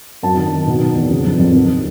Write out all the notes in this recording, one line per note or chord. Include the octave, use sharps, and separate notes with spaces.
F#2 A5
D#3
D#3
B2
B2
E2
C#3
F2
F2
D#2